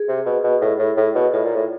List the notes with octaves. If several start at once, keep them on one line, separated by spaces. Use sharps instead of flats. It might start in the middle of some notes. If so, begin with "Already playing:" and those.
Already playing: G#4
C3
B2
B2
A2
A2
A2
B2
A2 F4
A#2
A2